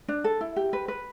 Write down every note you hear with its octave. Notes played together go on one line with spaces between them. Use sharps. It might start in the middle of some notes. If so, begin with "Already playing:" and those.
D4
A4
E4
G4
B4
B4